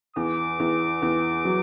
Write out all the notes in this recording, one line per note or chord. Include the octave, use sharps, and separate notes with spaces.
E2 D6
E2
E2
F#3